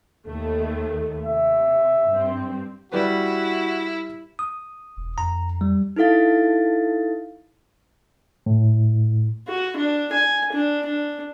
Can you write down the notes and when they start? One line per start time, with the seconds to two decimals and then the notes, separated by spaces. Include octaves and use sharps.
0.25 D#2 D#3 A3
1.26 C3 E5
2.08 G2 C4
2.92 G3 E4 F#4 B4
4.39 D#6
4.97 E1
5.18 F2 A#5
5.61 G3
5.96 D#4 E4 A4 F5 A6
8.46 A2
9.48 F#4
9.77 D4
10.13 G#5
10.52 D4
10.85 D4